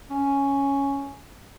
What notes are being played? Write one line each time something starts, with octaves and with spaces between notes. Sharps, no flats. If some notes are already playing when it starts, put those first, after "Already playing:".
C#4